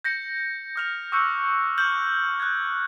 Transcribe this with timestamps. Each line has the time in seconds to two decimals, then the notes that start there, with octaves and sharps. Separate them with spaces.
0.04 G6 A#6 C#7
0.76 D#6 F6 F7
1.12 C#6 D6 E6 F#6 G6 C#7
1.78 F6 G6 F#7
2.40 F#6 G#6